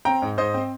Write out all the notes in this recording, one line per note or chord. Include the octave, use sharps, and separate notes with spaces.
C4 G5 A#5
G#2
G#2 C5 D#5
C4